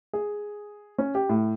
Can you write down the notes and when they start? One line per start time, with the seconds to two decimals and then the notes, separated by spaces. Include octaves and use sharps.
0.13 G#4
0.98 C#4
1.15 G4
1.29 A2